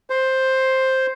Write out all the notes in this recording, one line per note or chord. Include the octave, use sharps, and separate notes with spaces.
C5